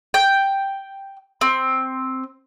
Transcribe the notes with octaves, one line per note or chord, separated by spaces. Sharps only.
G5
C4